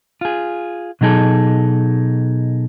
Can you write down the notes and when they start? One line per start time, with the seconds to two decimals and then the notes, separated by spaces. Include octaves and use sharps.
0.21 F4 G#4
1.01 B2 F#3 D#4 G#4 A4